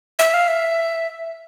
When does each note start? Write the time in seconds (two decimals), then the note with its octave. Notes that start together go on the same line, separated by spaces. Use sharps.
0.19 E5
0.34 F5
0.48 E5